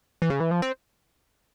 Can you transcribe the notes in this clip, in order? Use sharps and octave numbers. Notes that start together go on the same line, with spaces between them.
E3
C#3
E3
F3
C4